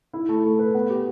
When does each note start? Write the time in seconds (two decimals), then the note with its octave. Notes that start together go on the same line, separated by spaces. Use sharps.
0.13 E4
0.29 A3
0.44 A3
0.59 B4
0.75 B3
0.90 G4